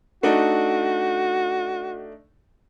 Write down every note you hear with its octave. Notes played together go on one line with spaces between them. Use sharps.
A3 D4 D#4 F#4